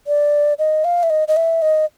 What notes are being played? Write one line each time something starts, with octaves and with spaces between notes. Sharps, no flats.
D5
D#5
F5
E5
D#5
D#5
E5
D#5